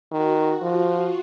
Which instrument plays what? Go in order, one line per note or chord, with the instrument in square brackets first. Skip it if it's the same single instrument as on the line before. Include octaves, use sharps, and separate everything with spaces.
[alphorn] D#3 [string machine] F#4
[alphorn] F3 [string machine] F4